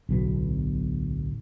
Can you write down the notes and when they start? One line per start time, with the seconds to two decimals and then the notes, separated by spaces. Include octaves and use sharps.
0.09 D1 B1 B2